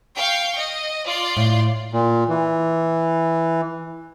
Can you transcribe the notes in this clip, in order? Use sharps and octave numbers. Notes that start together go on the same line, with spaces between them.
F5 G5 C#6
D#5
F4 D5 C6
A2
A#2
E3